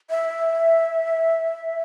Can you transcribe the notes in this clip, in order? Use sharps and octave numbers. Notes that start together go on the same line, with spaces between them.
E5